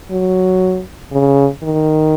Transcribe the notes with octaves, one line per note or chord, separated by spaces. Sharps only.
F#3
C#3
D#3